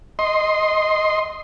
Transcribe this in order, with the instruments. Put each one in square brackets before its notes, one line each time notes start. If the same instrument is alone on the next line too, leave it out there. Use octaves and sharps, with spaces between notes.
[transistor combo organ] D#5 C6